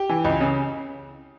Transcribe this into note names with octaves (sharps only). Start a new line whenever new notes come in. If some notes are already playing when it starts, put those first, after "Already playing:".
Already playing: G4
E3
C#2
C#3